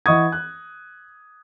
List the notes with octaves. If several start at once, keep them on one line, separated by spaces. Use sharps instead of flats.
E3 D#5 F#5 C#6 D#6 G#6
F#6